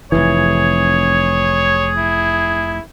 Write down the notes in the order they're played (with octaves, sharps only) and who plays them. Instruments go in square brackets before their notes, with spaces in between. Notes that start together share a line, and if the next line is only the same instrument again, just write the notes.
[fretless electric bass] F1 B1 E3 [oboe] G#4 [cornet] C#5
[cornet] E4